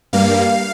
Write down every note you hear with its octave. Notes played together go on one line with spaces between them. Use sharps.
G2 G3 A#3 F5